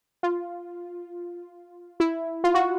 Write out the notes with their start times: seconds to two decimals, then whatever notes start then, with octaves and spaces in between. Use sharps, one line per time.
0.23 F4
2.00 E4
2.44 F4
2.54 F#4